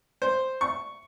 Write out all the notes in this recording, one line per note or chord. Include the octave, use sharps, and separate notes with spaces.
C5
C#6